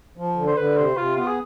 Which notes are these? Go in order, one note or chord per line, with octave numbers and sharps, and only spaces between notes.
F3
D3
C5
D3 B4
C3 C5
C3 F4
B3 F4
G#4